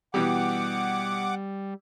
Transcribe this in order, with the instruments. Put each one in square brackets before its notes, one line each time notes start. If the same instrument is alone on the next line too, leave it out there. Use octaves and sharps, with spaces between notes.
[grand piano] B2 E3 G4 [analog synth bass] G3 [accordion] F#5 D6